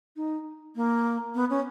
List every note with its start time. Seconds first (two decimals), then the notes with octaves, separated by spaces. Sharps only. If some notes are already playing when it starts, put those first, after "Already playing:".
0.16 D#4
0.76 A#3
1.35 B3
1.50 C#4